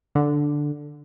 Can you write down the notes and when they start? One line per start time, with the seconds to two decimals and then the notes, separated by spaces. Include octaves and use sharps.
0.15 D3